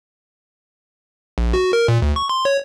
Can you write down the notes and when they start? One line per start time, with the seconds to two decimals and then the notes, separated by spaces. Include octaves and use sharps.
1.38 A#1
1.54 F#4
1.73 A#4
1.88 A#2
2.02 D2
2.16 C#6
2.29 C6
2.45 C#5